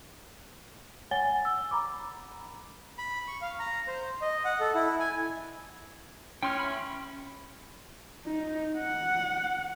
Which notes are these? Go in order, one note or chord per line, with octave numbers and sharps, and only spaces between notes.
C#5 F#5 G#5 A6 G7
E6
A#5 B5 D6
B5
C#6
F5
A#5
C5
D#5
F#5
A4
E4
G#5
C#4 G5 C6 F6
E5 B5
D#4
F#5